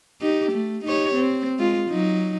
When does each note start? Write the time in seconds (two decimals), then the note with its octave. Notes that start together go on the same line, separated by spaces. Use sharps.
0.21 D#4 G4
0.51 A3
0.84 D#4 G4 C#5
1.14 C4
1.59 G#3 F4
1.89 F#3 D#4